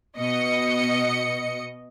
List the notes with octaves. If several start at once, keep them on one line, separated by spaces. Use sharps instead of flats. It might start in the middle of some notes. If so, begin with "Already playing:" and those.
B2 D#5 C#7